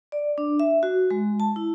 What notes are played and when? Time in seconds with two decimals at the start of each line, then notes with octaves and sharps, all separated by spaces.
0.12 D5
0.38 D4
0.60 E5
0.83 F#4
1.11 G#3
1.40 A5
1.56 E4